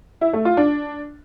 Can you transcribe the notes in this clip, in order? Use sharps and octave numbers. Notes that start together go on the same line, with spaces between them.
E4
A3
F4
D4